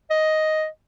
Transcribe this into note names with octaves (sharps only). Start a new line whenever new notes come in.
D#5